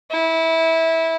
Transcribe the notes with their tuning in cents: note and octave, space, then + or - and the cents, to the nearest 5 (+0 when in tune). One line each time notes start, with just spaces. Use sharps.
E4 -20